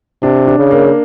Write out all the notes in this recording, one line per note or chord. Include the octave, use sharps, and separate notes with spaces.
C3 D4
D4
C#3
A#3